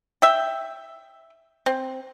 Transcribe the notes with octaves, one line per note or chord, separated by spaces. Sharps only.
E5 G5
C4